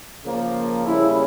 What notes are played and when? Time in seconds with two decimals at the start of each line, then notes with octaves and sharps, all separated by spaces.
0.25 C#3 F3 A#3
0.86 C#3 G3 A#3 E4